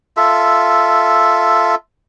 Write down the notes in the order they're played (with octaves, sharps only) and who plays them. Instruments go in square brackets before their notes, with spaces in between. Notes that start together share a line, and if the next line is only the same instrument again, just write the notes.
[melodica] F4 A4 E5